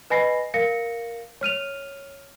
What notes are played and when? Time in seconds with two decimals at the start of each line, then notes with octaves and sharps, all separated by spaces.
0.10 B4 D#5 G#5 B5 A#6 C7
0.54 A#4 F5 A#6 C#7
1.41 C#5 F6 D#7 F7